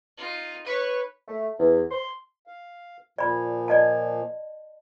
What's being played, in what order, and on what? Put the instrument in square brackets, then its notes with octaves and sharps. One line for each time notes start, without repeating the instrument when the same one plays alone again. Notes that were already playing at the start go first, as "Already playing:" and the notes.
[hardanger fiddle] D#4 F4
[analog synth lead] B4 [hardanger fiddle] C#5 C#6
[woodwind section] A3
E2
C6
[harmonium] F5
[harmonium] A#2 F3 [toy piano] D5 B5
[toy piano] D5 D#5 A5